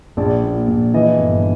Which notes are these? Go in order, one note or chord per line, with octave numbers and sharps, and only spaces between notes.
A#1 D5
A#2
A#1
E3 D#5
G1